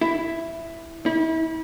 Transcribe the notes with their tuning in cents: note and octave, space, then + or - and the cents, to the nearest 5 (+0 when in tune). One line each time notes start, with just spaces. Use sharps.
E4 +5
E4 -35